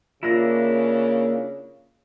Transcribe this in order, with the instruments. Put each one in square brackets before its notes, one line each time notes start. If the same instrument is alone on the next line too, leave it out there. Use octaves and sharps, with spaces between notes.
[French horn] C#3 [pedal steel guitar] A#3 D4 E4 [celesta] F4 A#6